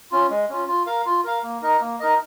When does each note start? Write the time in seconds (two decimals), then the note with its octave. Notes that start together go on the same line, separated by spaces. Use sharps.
0.12 C#4 F4
0.31 G#3
0.50 C#4 F4
0.68 F4
0.87 A#4 F5
1.06 F4
1.24 A#4 F5
1.43 A#3
1.62 D#4 A#4 D#5
1.81 A#3
2.00 D#4 A#4 D#5